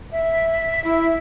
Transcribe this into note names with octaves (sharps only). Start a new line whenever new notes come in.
E5
E4